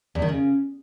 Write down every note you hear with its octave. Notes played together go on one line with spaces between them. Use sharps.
E2
D#3
C#3